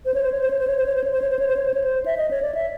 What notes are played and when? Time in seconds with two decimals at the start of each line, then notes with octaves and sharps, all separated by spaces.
0.05 C5
0.14 C#5
0.23 C5
0.32 C#5
0.41 C5
0.50 C#5
0.59 C5
0.67 C#5
0.77 C5
0.86 C#5
0.95 C5
1.04 C#5
1.12 C5
1.22 C#5
1.30 C5
1.39 C#5
1.48 C5
1.56 C#5
1.66 C5
1.74 C#5
1.84 C5
2.06 E5
2.18 D#5
2.31 C#5
2.42 D5
2.55 E5